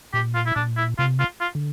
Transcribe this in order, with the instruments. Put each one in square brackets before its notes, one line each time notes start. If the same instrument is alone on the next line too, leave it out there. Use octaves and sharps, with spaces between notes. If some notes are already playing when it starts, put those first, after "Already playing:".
[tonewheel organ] A#2 [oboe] G4
[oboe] F4
E4
[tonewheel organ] A#2 [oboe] D4
[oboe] E4
[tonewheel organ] C3 [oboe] F4
[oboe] F4
F4
[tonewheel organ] D3